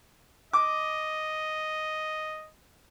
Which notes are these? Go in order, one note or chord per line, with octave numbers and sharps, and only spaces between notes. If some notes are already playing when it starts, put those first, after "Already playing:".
D#5 D6